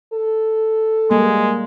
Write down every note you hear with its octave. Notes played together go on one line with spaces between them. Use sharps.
A4
G3 G#3 A#3